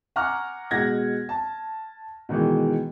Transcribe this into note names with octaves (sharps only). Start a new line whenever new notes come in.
F#5 G#5 A#5 C#6 D6 F6
B2 G#3 F#5 G#6 A#6
A5
B2 D#3 E3 G#3